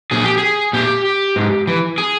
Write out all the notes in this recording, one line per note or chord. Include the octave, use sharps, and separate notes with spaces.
A#2 G#4
G4
G#4
A#2 G4
G#2
E3
G#4